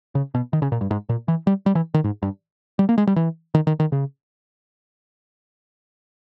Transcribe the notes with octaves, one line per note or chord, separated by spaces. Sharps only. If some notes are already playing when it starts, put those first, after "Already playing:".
C#3
B2
D#3
C#3
A#2
G2
G#2
A#2
E3
G3
G3
E3
D#3
G#2
G2
G3
A#3
G#3
G3
E3
D#3
D#3
D#3
C#3